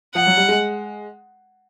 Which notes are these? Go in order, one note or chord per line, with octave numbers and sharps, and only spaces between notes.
F3 F#5
F#3
G3
G#3